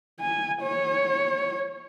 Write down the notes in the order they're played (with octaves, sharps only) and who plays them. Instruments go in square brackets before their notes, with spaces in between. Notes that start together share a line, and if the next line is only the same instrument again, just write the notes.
[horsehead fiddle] G#5
C#5